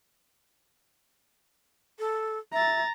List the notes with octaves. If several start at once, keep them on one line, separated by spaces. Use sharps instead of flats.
A4
E5 A#5 A6